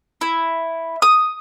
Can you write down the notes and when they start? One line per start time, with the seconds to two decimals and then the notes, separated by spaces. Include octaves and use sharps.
0.21 E4
1.02 D#6